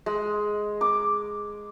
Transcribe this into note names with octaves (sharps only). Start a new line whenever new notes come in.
G#3
D6